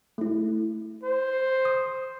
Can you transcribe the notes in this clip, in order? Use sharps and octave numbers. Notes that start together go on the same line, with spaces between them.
A3 E4
C5
D#6